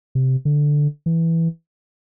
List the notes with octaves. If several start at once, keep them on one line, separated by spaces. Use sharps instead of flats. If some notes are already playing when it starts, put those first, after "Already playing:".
C3
D3
E3